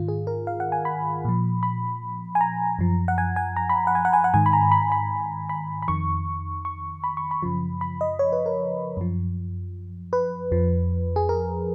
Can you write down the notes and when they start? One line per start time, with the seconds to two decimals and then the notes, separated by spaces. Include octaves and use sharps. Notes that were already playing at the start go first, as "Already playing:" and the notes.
Already playing: G#2 D#3 F4
0.08 G#4
0.27 A#4
0.47 F5
0.60 F#5
0.72 G#5
0.85 B5
1.25 A#2 F3
1.63 B5
2.35 G#5
2.41 A#5
2.79 F#2 F3
3.08 F#5
3.18 G#5
3.36 G#5
3.56 A#5
3.69 B5
3.87 F#5
3.95 G#5
4.05 F#5
4.13 G#5
4.24 F#5
4.34 G#2 D#3 G#5
4.46 B5
4.53 A#5
4.72 B5
4.92 B5
5.49 B5
5.82 B5
5.88 F2 D#3 C#6
6.65 C#6
7.04 B5
7.17 C#6
7.31 B5
7.43 F#2 C#3 F3
7.81 B5
8.01 D#5
8.19 C#5
8.32 B4
8.46 A#4
8.97 F#2 F3
10.13 B4
10.52 F2 F3
11.16 G#4
11.29 A#4